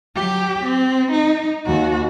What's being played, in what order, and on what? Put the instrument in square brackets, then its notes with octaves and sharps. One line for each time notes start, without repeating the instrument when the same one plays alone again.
[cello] F#3 G4
C4
D#4
D#2 F#4